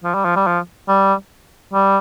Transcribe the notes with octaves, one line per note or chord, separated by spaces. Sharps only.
F3
G3
F3
G3
F3
G3
G3